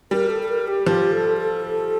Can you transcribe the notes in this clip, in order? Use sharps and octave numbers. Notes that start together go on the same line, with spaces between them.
G3 A#4
A4
A4
A#4
G4
F3 G4
A4
A4